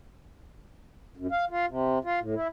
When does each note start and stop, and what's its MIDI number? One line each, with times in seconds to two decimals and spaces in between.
1.17 1.27 42
1.32 1.45 77
1.50 1.66 65
1.68 1.99 48
2.05 2.19 65
2.20 2.35 45
2.35 2.48 64